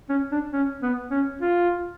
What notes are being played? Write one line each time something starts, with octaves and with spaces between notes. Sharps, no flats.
C#4
D4
C#4
B3
C#4
F4